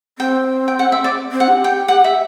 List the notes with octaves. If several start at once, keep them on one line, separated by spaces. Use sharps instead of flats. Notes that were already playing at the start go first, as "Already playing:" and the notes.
C4 G5
G5
F#5
E5
D5
C4
F#5
G4
G5
F#5
E5